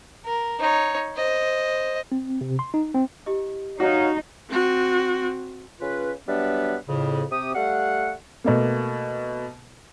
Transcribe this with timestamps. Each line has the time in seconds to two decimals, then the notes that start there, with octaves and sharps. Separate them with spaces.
0.25 A#4
0.60 D#4 C#5
1.15 C5 D#5
2.12 C4
2.41 C3
2.59 C6
2.74 D#4
2.94 C4
3.26 E4 G4 D#5
3.80 D#4 F#4 C#5 F5 F#5
4.50 C4 F#4
5.81 C#3 C#4 F4 B4
6.27 F#3 G3 B3 D4 B4 E5
6.87 F2 A2 C#3
7.30 C3 G4 D#6
7.55 G3 A3 F5 F#5
8.44 B2 A3 A#3